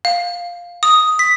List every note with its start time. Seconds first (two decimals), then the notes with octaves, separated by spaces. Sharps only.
0.05 F5
0.83 D#6
1.19 B6